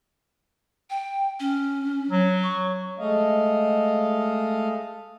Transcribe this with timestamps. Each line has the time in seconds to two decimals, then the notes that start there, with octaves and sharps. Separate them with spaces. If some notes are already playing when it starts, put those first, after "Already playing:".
0.90 G5
1.40 C#4
2.11 F#3
2.43 C#6
2.99 G#3 A3 D#5 F5